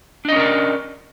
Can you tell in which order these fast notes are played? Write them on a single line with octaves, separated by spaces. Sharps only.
D4 D#5 C#4 A#4 D5